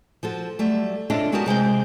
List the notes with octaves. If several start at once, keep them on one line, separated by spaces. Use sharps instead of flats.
F3 F#4 A4
F#3 G3 A3
D4 F4 A4 C#5 D#5 E5
G#3 B3 F#4 G4 A#4 A5
C3 G#3 C4 G5